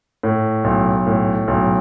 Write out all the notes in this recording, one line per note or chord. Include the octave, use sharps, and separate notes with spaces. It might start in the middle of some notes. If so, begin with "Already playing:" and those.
A2
B1
A2
B1